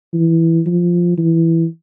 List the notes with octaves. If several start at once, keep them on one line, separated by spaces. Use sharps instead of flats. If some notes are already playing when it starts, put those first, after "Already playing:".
E3
F3
E3